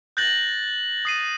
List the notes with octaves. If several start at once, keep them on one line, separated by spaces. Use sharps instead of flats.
F#6 G6 A6 A#6 F#7
D#6 C7 D#7